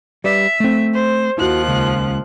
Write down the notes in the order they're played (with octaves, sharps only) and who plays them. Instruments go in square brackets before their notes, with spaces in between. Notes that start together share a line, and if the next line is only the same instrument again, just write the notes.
[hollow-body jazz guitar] G3 B4 D5 [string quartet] E5
[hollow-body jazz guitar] A3 C4
[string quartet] C5
[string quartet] D#2 F3 F#6 [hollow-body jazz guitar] E4 F#4
[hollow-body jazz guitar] C#2